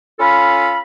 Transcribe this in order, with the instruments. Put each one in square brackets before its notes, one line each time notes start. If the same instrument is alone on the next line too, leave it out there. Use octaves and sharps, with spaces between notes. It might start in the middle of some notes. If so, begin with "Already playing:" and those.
[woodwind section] C#4 F4 A4 F5 B5